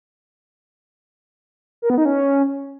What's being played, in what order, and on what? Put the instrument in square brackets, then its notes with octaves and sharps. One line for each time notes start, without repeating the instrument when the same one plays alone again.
[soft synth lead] A#4
B3
D#4
C#4